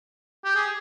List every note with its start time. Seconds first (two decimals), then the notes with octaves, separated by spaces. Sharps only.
0.45 G4
0.55 G#4